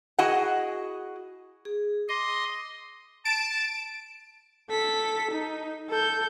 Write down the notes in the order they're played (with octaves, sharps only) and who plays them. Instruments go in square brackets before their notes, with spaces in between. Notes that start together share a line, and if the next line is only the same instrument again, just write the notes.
[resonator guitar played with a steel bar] E4 F#4 G#4 D#5 F#5
[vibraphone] G#4
[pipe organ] D#5 C6 [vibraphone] D6
[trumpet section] A5 [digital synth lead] D7
[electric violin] A4 B6
D#4
A4 G6